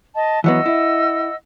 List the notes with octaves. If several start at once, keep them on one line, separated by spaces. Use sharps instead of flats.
D#5 A5
E3 F#3 B3 D#5 F#5 E6
E4